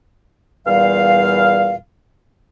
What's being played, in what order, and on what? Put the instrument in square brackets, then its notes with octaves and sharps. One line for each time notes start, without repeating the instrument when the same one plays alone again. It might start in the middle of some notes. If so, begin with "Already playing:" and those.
[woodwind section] E2 A#2 G3 F5